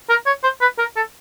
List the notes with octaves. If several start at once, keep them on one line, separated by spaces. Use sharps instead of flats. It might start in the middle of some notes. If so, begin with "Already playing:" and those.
A#4
C#5
C5
B4
A#4
A4